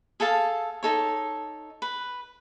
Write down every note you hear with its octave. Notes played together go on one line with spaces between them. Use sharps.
G#4 A4 F5 A5
D#4 A4 C#5
B4